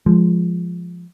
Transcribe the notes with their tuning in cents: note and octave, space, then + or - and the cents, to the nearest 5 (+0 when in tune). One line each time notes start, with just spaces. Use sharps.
F3 +0 G#3 +0